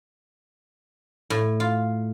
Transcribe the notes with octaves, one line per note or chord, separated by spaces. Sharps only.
A2
F4